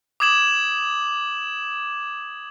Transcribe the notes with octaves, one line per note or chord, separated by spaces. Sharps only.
D6 D#6 G#6 E7 F#7